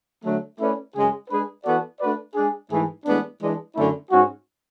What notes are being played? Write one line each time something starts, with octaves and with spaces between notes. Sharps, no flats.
D3 F#3 A3
A3 C#4 E4 B4 D5
F#2 C#3 G#3 C#4 G#4
G#3 D4 G#4 B4
E3 B3 F#4 A4 D5
A3 D4 F#4 B4 D5
G#3 D4 G#4
G#2 E3 A3 E4 G#4
A2 E3 G#3 B3 D4
E3 G#3 D4
F#2 D3 A3 C#4 E4
G#2 G#3 C#4 F#4